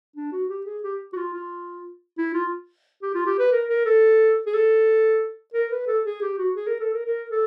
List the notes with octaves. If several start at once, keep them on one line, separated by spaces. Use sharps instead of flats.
D4
F#4
G4
G#4
G4
F#4
F4
F4
E4
F4
G4
F4
G4
B4
A#4
A#4
A4
G#4
A4
A#4
B4
A4
G#4
G4
F#4
G#4
A#4
A4
A#4
A#4
A4